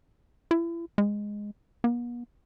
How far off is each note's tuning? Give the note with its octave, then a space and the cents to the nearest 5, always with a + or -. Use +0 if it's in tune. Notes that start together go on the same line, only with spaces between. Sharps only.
E4 +35
G#3 -5
B3 -45